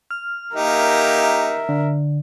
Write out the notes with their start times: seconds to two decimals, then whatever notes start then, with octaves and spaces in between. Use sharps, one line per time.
0.11 F6
0.55 A#3 D#4 G4 A#4 E5
1.69 D3